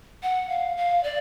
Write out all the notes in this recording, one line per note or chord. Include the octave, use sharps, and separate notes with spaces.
F#5
F5
F5
D5